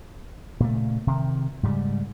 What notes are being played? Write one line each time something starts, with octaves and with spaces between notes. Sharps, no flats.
A#2 C#3 A3
C3 D#3
G#2 C#3 G3